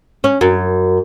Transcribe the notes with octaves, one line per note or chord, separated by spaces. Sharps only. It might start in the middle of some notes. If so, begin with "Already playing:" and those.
C#4
F#2